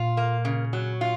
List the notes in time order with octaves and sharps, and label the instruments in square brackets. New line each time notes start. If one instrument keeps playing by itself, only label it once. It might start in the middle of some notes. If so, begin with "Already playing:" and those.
Already playing: [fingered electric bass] A#2 [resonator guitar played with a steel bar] F4
[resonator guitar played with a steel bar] A#3
C#3
F#3
F4